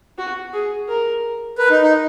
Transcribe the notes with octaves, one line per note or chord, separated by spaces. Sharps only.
F#4
G#4
A#4
A#4 B4
D#4
D#4